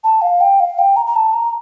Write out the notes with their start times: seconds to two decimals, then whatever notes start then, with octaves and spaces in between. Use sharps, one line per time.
0.04 A5
0.22 F5
0.41 G5
0.60 F5
0.79 G5
0.96 A#5
1.07 A#5
1.16 A5
1.34 A#5